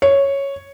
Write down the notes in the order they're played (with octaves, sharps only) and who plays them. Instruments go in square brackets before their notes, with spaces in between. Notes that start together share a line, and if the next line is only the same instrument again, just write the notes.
[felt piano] C#5